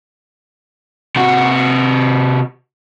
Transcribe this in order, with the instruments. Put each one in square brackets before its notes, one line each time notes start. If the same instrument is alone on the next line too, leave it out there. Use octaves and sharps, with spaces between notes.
[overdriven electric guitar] C3 F#4